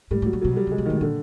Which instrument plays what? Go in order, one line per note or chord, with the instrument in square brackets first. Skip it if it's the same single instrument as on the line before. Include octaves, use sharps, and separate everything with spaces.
[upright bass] A2 [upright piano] G3
[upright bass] A2 [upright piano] F#3
[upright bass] A#2
[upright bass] B2 [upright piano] F#3
[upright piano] G3
[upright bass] C#3 [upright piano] G#3
[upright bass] B2
[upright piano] D#3
[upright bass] A2
[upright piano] D#3
[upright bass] A#2 [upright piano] D3